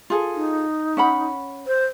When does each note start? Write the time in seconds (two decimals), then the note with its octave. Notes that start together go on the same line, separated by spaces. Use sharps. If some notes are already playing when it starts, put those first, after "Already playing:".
0.10 F4 G#4 A4
0.35 D#4
0.97 C#4 F#5 B5
1.67 C5